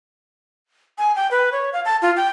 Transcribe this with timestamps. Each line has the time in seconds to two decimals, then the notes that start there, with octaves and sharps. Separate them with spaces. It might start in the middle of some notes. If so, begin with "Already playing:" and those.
0.98 G#5
1.16 G5
1.31 B4
1.52 C#5
1.73 F5
1.85 A5
2.02 F4
2.17 G5